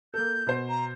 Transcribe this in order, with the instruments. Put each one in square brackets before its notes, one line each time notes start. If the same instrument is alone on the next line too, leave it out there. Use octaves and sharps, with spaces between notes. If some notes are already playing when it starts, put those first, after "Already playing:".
[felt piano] A#3 A4 [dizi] G6
[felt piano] B2 C5
[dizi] A#5